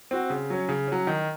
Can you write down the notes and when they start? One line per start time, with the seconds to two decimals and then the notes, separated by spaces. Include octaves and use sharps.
0.11 C4 F#4
0.30 C#3
0.50 F#3 C#4
0.69 C#3
0.87 F#3 C#4
1.07 D#3